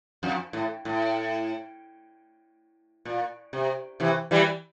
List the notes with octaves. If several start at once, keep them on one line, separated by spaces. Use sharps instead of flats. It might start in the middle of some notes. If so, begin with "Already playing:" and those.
F2
A2
A2
A#2
C3
C3 E3
E3 G3